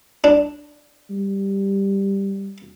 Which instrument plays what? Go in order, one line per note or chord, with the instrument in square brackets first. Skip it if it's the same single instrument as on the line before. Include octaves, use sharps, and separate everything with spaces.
[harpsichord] D4
[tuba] G3